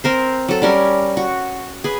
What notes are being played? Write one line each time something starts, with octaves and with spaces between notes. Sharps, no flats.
C4 A#4 C5
F#3 A4
G3 C#4 A#4
F#4
G#4 B4